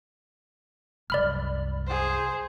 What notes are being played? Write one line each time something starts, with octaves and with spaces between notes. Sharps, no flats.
C2 F#2 D5 B5 F6
G#4 C5